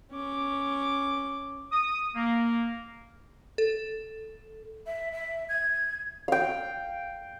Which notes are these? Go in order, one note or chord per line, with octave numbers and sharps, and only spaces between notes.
C#4 D6
D#6
A#3
A4
E5
E5
G#6
F5 G5